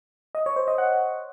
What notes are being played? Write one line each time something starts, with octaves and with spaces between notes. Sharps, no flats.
D#5
C#5
C5
D#5
F#5